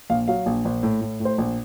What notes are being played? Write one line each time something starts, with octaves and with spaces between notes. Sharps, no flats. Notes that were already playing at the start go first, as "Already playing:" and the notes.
A#1 F5
F#3 F5
A#1
A#1
A2
A2
A2
C5
A#1